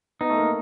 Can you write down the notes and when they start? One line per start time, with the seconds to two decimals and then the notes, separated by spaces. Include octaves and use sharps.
0.21 B3 D#4
0.30 A3
0.37 A#3